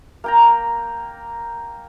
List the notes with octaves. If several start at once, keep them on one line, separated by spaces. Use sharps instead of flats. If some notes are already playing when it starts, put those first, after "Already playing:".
A#3 G5 A#5